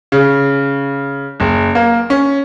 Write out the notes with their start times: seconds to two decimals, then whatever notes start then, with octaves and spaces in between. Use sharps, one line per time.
0.12 C#3
1.40 F#1
1.75 A#3
2.10 C#4